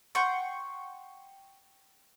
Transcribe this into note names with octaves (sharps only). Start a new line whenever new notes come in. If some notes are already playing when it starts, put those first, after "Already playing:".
F#5 G5 C6 C#6